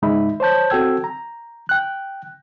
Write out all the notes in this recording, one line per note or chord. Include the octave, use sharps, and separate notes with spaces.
C#2 G#2 G#3 D#4 E5 B5
C5 C#5 A5 G6
C4 F#4 A4 G5 E6 G#6
A#5
G5 F#6